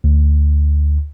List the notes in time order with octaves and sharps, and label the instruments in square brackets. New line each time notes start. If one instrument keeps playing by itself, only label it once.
[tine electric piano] D2